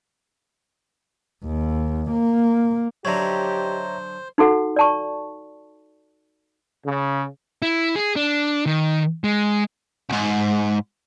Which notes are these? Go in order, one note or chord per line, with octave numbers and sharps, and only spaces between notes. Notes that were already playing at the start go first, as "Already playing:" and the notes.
D#2
A#3
D3 F#3 G4 C5 C#5 D#5 E5 A#5
D#4 F#4 A4 F#5
D5 A5 C#6
C#3
E4
G#4
D4
D#3
G#3
C2 G#2